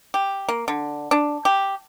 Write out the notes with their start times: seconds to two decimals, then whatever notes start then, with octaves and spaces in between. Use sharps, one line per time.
0.14 G4
0.49 A#3
0.68 D3
1.11 D4
1.45 G4